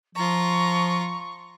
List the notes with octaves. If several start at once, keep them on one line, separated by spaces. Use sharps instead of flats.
F3 F4 A#5 C#6